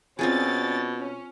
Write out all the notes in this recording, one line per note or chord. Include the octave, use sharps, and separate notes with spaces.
B2 C4 C#4 F4 G#4 D5 A6
C#4